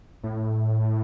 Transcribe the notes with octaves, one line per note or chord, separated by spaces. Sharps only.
A2